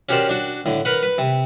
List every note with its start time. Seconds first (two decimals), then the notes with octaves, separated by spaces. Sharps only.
0.09 C#4 F#4 G4 A#4 C5 D5
0.29 D4 F#4
0.66 A2 D3
0.85 A#4 B4 F#5
1.03 B4
1.18 C3